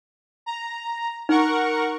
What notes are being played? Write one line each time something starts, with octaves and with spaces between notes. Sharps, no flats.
A#5
D#4 A#4 F#5 C#6